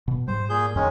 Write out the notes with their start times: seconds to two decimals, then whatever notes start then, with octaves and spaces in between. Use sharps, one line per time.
0.08 B2
0.28 G#2 G3 C5
0.49 A#2 G#4 G6
0.76 F2 D#3 G#3 C#4